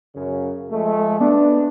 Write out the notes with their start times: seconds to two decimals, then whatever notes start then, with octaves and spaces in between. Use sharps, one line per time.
0.16 F#2 C#3
0.71 F3 G#3 A3
1.20 B3 D4